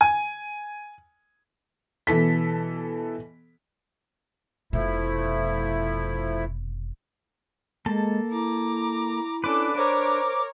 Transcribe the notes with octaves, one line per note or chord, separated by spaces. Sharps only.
G#5
B2 E3 A4 B6
F1 B2 F3 A3 E4
G#3 A#3 A4 A5
E4 A#5 D6
C#4 D4 A4 B4 D6
A#4 C5 C#5